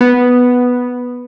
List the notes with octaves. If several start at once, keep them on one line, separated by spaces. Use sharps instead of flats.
B3